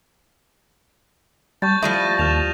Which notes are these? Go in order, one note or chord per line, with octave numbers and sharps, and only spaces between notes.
G3 A5 C#6 G6 A6
F3 G3 A3 E4 D#6 A#6 D#7
D#2 F6 E7 F7